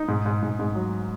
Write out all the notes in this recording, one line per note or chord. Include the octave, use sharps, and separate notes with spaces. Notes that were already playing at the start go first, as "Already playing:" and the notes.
Already playing: D#4
G#2
G#2
G#2
G#2
F#3